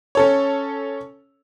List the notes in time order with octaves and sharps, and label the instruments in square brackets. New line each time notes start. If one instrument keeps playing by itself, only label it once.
[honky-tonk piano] C#4 A4 C#5